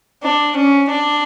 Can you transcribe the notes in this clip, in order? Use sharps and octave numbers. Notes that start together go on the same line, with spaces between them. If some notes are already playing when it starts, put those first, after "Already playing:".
D4
C#4
D4